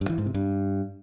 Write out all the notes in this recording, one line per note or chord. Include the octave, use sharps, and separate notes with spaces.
G2
E3
G#2
C3
G2